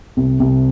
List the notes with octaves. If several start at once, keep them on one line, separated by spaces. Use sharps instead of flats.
C2
C2